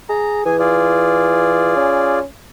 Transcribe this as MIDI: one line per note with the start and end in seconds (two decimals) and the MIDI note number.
0.09 0.44 68
0.09 0.42 82
0.45 1.75 52
0.45 0.57 68
0.45 0.57 80
0.59 2.19 65
0.59 2.19 68
0.59 2.19 74
1.76 2.24 61